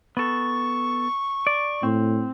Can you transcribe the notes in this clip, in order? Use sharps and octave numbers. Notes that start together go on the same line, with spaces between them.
B3 A4 C#6
D5
A2 C4